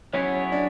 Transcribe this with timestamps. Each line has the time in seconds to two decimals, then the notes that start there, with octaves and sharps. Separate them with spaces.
0.13 F#3 B3 C#4 E4 G#4 C#5
0.52 D4